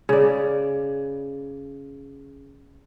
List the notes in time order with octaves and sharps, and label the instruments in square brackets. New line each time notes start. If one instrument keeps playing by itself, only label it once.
[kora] C#3 D5